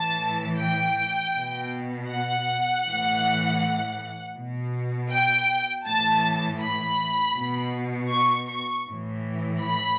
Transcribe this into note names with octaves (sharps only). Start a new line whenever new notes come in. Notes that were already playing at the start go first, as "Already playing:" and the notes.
Already playing: A2 E3 A5
G5
B2
F#5
A2 E3
B2
G5
A2 E3 A5
B5
B2
C#6
C#6
A2 E3
B5